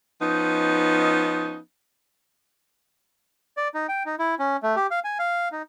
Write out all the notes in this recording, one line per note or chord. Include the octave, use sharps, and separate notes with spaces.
F3 B3 C#4 D#4
D5
D#4
G5
D#4
E4
C#4
A3
G4
F5
G#5
F5
D#4